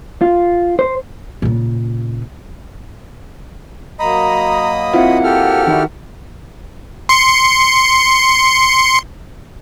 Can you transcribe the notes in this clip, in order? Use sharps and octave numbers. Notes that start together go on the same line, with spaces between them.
F4
C5
A#2 C#3
F#3 A#3 D#5 A#5 B5 D#6
C4 E4 F4 F#5
G4 A4 F6
D#3 D4 E4 F#4
C6 C#7